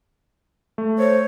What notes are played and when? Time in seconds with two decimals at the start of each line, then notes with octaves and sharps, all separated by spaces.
0.78 A3
0.99 C5 C#5